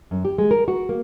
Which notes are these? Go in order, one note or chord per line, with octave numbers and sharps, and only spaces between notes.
F#2
G4
G#3
A#4
F#4
A#3